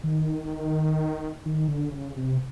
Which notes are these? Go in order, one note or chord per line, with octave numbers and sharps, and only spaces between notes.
D#3
D#3
D3
C#3
C3